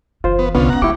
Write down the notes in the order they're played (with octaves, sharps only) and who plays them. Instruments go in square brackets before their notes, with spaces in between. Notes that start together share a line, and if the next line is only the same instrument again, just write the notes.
[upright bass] F#1 E3 [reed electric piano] F4 C5
[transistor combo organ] B3
[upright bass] C2 [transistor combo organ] D3 C#4 F4 [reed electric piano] B3
[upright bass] G#3 C#4 [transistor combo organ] F#5 A#5
[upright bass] G#3 [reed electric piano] E4 D6 [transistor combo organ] G4 C#6